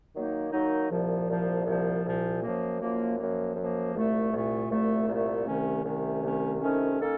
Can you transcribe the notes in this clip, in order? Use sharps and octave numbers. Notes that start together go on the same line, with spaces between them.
D#3 F#3 A#3 D#4
D#3 F#3 A#3 D#4
C2 A#2 F3
C2 A#2 F3
C2 A#2 F3
C2 A#2 F3
F#2 F3 A#3
F#2 F3 A#3
F#2 F3 A#3
F#2 F3 A#3
C2 A#2 A3
C2 A#2 A3
C2 A#2 A3
C2 A#2 A3
C2 C3 D#3 A3 C#4
C2 C3 D#3 A3 C#4
C2 C3 D#3 A3 C#4
C2 C3 D#3 A3 C#4
D#3 A#3 C#4 A4